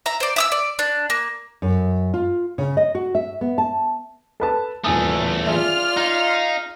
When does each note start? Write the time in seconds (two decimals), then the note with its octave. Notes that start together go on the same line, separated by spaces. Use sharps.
0.06 E5 A#5
0.20 C5 D5
0.36 E5 D#6 E6
0.52 D5
0.79 D4
1.10 A#3
1.62 F#2
2.14 F4
2.58 C#3
2.77 D#5
2.95 F#4
3.15 E5
3.41 B3
3.58 A5
4.40 A4 B4 A5
4.84 D#1 E2 A3 G#5 D#6
5.47 F4 G#4 D5 E5 F6
5.97 D#4 F5